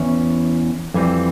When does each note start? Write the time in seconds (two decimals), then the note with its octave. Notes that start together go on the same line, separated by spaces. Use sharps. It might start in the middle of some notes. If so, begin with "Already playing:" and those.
Already playing: E2 E3 C#4
0.94 F2 E3 G3 C4